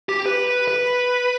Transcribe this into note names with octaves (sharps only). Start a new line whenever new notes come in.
G4
B4
B4
B4